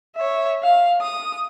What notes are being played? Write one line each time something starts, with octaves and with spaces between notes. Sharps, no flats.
C#5 E5
F5
D#6